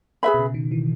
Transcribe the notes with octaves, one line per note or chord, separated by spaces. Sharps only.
G#4 B4 E5 B5
B2
C#3
D#3
E3